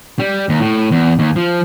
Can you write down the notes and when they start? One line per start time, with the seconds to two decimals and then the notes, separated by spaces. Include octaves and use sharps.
0.19 G3
0.49 D#2
0.60 A2
0.91 E2
1.19 D#2
1.36 F3